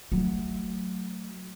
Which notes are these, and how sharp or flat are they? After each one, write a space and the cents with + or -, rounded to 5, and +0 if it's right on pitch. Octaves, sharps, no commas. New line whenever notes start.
F#3 +0 A3 +10